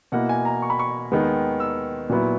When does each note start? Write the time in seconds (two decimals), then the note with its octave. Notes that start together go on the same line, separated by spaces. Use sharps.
0.12 B2 A#3 E4 F#5
0.29 G#5
0.45 A#5
0.62 C#6
0.70 B5
0.79 C#6
1.12 D#2 D#3 G#3 B3
1.60 E6
2.09 A#2 F#3 B3 E4